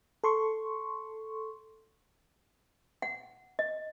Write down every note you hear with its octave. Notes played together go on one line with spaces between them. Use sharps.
A4 C6 C#6
F#5
D#5